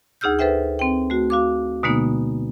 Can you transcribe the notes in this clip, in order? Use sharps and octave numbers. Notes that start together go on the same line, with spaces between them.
D2 D#4 G#4 E6 F6 G6
A4 B4 C5 E5 G5
C4 G5
A3 F#4
F#4 F5 D6
B2 D3 G#3 A#3 B3 D#4